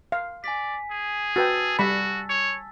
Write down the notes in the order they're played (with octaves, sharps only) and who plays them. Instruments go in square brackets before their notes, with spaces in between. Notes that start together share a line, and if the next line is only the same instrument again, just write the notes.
[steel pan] F5
[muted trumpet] D5 [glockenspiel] G#5 B6
[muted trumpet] G#4
[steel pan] F#4 B4 G5 [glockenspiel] A5 E6 A6
[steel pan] G3 B5 [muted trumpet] F#4
[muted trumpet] C#5